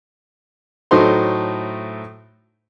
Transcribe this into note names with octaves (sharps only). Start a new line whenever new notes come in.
A2 F#3 A3 D#4 C5 C6